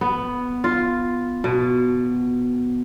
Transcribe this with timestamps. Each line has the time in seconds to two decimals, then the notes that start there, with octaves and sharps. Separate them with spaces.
0.01 B3
0.64 F4
1.44 B2